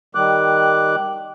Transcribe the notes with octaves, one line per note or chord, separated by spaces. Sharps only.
D#3 G3 D6 F#6